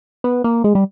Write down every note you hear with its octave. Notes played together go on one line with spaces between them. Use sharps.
B3
A#3
G#3
G3